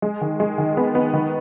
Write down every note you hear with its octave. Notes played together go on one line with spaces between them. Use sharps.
G#3
D#3
G#3
D#3
B3
B3
D#3